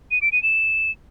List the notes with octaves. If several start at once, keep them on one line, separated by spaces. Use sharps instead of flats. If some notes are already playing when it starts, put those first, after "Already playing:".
D#7
D7
D#7
E7